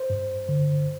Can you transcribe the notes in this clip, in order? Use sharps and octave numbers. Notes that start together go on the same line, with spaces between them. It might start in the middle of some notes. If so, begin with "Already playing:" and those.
Already playing: C5
G2
D3